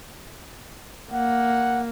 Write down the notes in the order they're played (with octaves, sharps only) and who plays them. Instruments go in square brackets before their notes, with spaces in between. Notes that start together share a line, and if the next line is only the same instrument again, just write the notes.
[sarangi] A#3 [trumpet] F#5